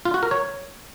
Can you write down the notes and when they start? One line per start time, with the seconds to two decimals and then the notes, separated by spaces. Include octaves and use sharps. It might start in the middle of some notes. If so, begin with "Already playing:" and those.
0.05 F4
0.14 F#4
0.23 A#4
0.31 C#5